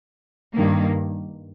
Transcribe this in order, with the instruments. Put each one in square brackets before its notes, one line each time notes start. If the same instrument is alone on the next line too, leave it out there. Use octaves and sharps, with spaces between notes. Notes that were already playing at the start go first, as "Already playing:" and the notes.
[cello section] G2 D#3 A#3